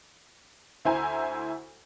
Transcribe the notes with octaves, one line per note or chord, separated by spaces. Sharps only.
D2 E4 C5 G#5 A#5